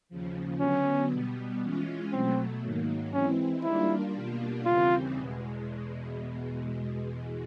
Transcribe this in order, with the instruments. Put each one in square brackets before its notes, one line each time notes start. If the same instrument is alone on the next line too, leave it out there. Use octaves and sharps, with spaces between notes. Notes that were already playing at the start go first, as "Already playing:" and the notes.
[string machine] D#2 C#3 F3
[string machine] D3 F#3 B3 [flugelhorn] C#4
[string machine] B2 G3 B3
E3 G#3 C#4 F4
[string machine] B2 F#3 A3 [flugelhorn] C4
[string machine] G#2 D#3 F#3 A#3
[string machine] E3 G#3 C4 E4 [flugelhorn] C#4
[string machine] D#3 G3 A#3 D4 F4 [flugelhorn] E4
[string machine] B2 G3 A#3 D4 F4
[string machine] D#2 C#3 E3 G3 C4 [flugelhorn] F4
[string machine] E2 B2 G#3